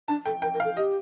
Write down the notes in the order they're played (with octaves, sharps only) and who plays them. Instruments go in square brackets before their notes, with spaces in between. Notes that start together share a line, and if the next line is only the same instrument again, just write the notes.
[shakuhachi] D4 [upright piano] A5
[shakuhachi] A4 [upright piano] G5
[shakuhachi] A#4 [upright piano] G5
[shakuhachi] A#4
[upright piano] F5
[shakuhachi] A4
[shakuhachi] G4 [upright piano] D#5